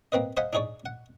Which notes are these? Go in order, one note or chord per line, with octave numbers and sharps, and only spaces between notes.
A#3 C4 B4 D#5
C5 D#5 F5 F#5 G#5 B5
D4 D#4 G#4 C#5 D5
F#5